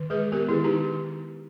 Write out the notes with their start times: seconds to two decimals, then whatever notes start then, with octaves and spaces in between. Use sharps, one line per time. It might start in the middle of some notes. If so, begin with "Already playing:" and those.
Already playing: D#3
0.10 G#3 G#4 B4
0.32 B3 G4 A#4
0.49 D#3 E4 G#4
0.64 D#4 G4
0.75 D#3